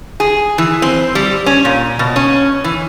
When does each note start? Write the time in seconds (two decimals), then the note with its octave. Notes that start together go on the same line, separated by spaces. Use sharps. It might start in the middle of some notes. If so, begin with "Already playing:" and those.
0.20 G#4
0.58 E3
0.82 C4
1.15 G3
1.46 C#4
1.65 A#2
1.99 B2
2.16 C#4
2.64 E3